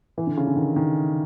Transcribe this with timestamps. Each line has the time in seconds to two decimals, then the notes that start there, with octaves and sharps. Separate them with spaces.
0.18 E3
0.27 D3
0.38 C#3
0.47 D3
0.56 D#3
0.76 D#3